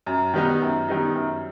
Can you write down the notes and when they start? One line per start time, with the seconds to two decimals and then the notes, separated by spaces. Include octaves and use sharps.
0.06 F#2
0.34 D#3 G3 B3 D#4
0.62 F#2
0.89 D#3 G3 B3 D#4
1.15 F#2